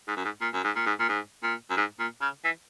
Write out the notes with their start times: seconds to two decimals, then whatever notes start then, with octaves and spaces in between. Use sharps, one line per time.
0.08 G#2
0.17 F#2
0.25 G#2
0.41 A#2
0.54 F#2
0.64 G#2
0.76 A#2
0.86 G#2
1.00 A#2
1.09 G#2
1.43 A#2
1.70 F#2
1.77 G#2
2.00 A#2
2.21 C#3
2.45 E3